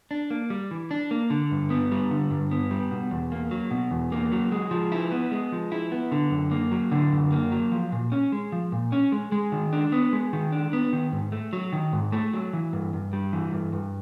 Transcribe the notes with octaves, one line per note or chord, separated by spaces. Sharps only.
D4
A#3
G3
E3
D4
A#3
D3
G2
B3
G3
D3
G2
B3
G3
B2
E2
A#3
F#3
B2
E2
A#3
F#3
G#3
F3
E4
B3
G#3
F3
E4
B3
D3
F#2
A#3
F#3
D3
F#2
A#3
F#3
F3
A#2
C#4
G#3
F3
A#2
C#4
G#3
G#3
D#3
D4
B3
G#3
D#3
D4
B3
D#3
G#2
A3
F#3
D#3
G#2
A3
F#3
E3
G2
G2
G3
E3
G2
G2